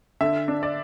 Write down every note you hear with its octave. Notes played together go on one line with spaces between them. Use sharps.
D3 E5
D4
D5